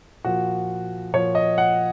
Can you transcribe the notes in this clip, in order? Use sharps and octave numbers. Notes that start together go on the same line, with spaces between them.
A#2 F3 F#4
A#2 F3 C#5
D#5
F#5